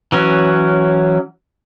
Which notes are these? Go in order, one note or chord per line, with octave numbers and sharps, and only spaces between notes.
E3 F#3 C#4